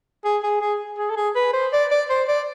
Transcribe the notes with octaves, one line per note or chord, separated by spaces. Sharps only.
G#4
G#4
G#4
G#4
A4
G#4
B4
C5
D5
D5
C5
D5